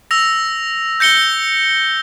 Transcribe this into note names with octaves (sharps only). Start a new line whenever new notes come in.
E6 A#6 F7
G6 A#6 C#7 G7